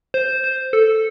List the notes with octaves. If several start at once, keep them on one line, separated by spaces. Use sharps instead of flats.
C5
C5
A4